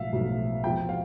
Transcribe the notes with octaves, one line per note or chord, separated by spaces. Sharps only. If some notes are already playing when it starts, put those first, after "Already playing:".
Already playing: B1 A2 F3 E5 F5
B1 A2 F3
E2 C3 F3 G5
F5